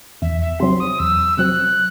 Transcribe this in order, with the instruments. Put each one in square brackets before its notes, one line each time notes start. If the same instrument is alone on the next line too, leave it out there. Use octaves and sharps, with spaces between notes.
[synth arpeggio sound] E2 [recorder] E5
[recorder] E5
[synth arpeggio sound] C3 F#3 C4 [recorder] C6
[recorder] D#6
[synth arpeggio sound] E2 [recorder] E6
[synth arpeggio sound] C3 F#3 C4 [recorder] F#6